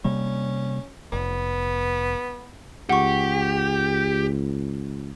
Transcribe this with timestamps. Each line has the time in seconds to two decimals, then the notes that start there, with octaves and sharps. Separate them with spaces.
0.05 C3 G3 A#3 C#4
1.13 F1 B3
2.89 C#2 G4 F#5 C#6